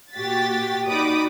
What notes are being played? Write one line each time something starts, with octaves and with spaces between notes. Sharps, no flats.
A#2 F#4 G4 A6 B6
D#4 F#4 D5 B5 D6 D#6